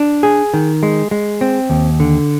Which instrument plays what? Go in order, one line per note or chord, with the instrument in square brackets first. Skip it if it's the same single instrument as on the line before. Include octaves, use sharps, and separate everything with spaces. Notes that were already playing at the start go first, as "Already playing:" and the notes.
Already playing: [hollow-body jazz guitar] D4
G#4
D#3
G#3
G#3
C4
D#2
D3